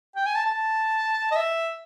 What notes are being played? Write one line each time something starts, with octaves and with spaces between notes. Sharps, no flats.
G5
G#5
A5
A5
D#5
E5